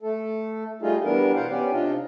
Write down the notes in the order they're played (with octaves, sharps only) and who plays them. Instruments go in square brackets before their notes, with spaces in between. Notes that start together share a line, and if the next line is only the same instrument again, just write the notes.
[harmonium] A3 A4
G3 A3 D#4 F4 G#4
E3 G3 B3 D4 A#4
B2 B3 C5 F5 F#5
B3 C#4 G4 D5
C3 D4 D#4 F4